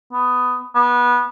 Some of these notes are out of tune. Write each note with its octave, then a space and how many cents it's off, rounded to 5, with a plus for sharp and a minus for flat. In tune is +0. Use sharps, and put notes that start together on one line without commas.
B3 +10
B3 -20